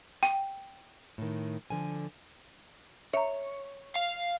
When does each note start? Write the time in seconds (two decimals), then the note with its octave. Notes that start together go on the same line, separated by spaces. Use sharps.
0.23 G5
1.18 A2 D#3
1.70 D3 F3 G#5
3.13 C#5 E5 A#5
3.96 F5